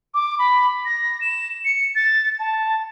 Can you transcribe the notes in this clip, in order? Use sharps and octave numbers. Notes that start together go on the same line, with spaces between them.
D6
B5
A#6
E7
C#7
A6
A5